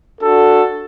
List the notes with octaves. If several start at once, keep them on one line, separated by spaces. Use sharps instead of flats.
D4 F#4 A4